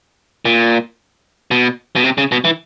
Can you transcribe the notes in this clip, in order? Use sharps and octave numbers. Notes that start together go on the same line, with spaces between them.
A#2
B2
B2
C3
C#3
B2
E3